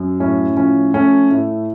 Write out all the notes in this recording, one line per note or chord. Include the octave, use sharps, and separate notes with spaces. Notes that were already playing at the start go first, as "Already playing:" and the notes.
Already playing: F#2
A2 C#4
F3 C#4
A3 C#4
A2